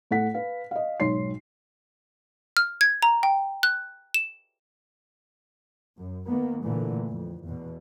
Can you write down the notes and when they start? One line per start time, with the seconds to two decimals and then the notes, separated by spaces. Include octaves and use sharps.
0.11 A2 A4 F#5 B6
0.34 B4 F5
0.71 D#5 F5
1.00 B1 G#2 C#5 C6 C7
2.57 F6
2.81 G#6
3.03 A#5
3.23 G5
3.63 F#6
4.14 E7
5.97 F#2
6.27 D#3 A#3 B3
6.63 A#2 D3 E3 A3
7.08 F2
7.47 E2 B2